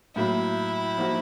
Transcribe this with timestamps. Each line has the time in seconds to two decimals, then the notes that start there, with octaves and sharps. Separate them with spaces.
0.15 A2 F#3 A#3 E4
0.98 F3 A#3 D#4 F#4